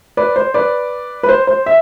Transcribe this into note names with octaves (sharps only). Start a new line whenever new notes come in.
B4 D5
C5
B4 D5
B4
C5
C5
E5